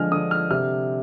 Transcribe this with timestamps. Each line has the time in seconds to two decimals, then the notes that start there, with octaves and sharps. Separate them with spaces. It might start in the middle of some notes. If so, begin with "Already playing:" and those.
Already playing: D3 F3 G#3 D#5 G#5 F6
0.11 D3 D#6
0.31 F6
0.51 C3 F6